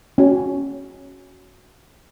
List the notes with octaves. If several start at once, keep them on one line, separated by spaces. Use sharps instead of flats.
C#4 F#4